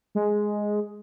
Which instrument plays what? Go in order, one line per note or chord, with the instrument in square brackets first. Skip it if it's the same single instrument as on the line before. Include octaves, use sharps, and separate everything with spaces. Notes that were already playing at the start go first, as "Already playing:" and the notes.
[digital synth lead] G#3